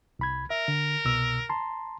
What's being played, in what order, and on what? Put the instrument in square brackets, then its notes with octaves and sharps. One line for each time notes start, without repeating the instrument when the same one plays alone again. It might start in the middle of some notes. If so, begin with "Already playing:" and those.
[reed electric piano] C2 B5 G#6
[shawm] A#4 [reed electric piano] E5
[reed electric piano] D3
C2 B2 E6
A5 A#5 C6